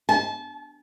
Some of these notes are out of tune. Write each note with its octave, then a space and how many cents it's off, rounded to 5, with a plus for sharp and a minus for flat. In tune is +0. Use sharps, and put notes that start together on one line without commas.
A5 -30